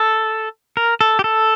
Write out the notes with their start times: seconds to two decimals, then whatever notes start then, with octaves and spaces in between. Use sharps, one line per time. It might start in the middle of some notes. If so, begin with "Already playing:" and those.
Already playing: A4
0.77 A#4
1.01 A4
1.19 G4
1.24 A4